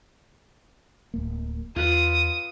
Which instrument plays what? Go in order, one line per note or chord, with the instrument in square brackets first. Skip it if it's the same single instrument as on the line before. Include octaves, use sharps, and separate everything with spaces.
[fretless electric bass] D1 A#3
[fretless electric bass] E2 [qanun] F4 B4 [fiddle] D#6